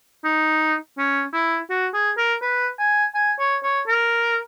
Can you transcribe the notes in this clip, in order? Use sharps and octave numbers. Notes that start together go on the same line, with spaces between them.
D#4
C#4
E4
F#4
G#4
A#4
B4
G#5
G#5
C#5
C#5
A#4